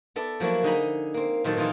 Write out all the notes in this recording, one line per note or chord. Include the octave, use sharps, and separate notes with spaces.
B3 A4 D5 E5
F3 F#3 A#3 E4
D3 D#4 G#4 D#5 A#5 B5
A#3 C4
A#2 D#3 F#3 A4
A#2 E3 D#4 F4 G#4